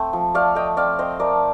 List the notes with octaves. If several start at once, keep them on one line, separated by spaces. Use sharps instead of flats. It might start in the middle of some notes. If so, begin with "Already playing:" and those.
Already playing: A3 C4
F3
A3 D5 F5
A3 D#5 G5
C4 D5 F5
C4 C5 D#5
A3 A#4 D5